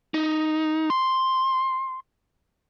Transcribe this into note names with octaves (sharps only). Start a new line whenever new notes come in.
D#4
C6